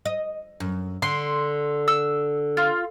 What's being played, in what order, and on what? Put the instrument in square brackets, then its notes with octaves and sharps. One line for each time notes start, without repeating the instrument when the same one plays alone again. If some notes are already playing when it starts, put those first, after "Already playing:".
[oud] D#5
F#2
[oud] D3 [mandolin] C6
[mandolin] E6
F4